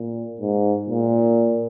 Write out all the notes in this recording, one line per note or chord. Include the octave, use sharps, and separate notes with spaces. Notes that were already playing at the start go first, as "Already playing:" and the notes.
Already playing: A#2
G#2
A#2